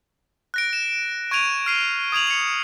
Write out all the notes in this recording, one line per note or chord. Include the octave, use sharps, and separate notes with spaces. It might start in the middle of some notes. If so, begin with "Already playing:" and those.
F#6 A#6 D7
E7
C#6 G#6 D7 D#7 F7
F6 C7 D#7
D#6 G#6 D#7 F7 F#7
C#7 F7